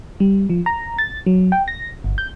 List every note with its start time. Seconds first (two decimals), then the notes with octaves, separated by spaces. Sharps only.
0.20 G3
0.50 F3
0.66 A#5
0.98 A6
1.26 F#3
1.52 G5
1.68 A#6
2.04 G1
2.18 G6